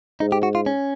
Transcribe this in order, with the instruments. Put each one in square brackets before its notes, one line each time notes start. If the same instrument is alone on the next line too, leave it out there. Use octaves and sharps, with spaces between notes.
[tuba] G#2 [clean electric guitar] D#4
[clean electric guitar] G4
F#4
F4
C#4